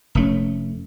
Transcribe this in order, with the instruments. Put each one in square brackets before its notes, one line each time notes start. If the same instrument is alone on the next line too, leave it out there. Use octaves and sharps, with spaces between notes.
[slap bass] F1 A3 C#4